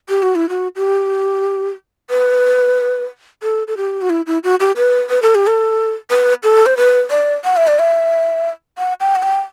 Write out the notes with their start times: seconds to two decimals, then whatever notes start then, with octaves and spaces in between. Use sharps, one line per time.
0.09 G4
0.23 F#4
0.35 E4
0.49 F#4
0.76 G4
2.10 B4
3.43 A4
3.68 A4
3.77 G4
4.02 F#4
4.10 E4
4.27 E4
4.44 F#4
4.60 G4
4.76 B4
5.10 B4
5.22 A4
5.35 G4
5.47 A4
6.10 B4
6.43 A4
6.66 C5
6.77 B4
7.10 D5
7.44 F#5
7.56 E5
7.67 D5
7.79 E5
8.78 F#5
9.00 G5
9.15 F#5
9.23 G5